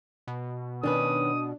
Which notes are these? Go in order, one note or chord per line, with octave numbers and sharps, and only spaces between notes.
B2
D#3 C#4 D4 B4 D#6